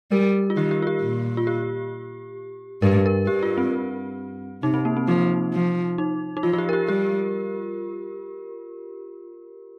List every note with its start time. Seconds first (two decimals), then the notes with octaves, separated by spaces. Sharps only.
0.11 G3 A#4
0.50 F4
0.56 D#3 G4
0.71 G4
0.82 F4
0.87 G4
1.02 A#2
1.37 F4
1.47 G4
2.82 G2 A#4
3.06 A#4
3.27 G2 G4
3.43 F4
3.58 C4
4.63 C3 D#4
4.74 C4
4.85 A#3
4.97 C4
5.07 F3 D#4
5.53 F3
5.98 D#4
6.37 D#4
6.43 F3 F4
6.53 F4
6.58 G4
6.69 A#4
6.73 G4
6.88 G3 G4